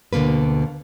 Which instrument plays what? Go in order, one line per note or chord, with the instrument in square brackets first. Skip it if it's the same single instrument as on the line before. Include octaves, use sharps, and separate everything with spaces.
[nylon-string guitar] D2 B2 D3 A#3 B4